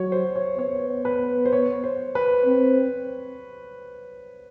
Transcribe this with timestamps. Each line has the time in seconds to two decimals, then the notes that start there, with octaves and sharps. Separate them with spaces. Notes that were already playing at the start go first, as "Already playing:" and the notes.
Already playing: F#3 C#5
0.12 C5
0.35 C#5
0.58 B3 C#5
1.05 B4
1.45 C5
1.52 C#5
1.84 C5
2.15 B4
2.46 C4